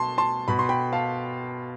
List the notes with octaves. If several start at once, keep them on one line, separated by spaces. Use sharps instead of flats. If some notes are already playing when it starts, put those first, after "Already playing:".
Already playing: B2 A5 C6
A5 C6
B2 B5
C6
G5 B5
F5 A5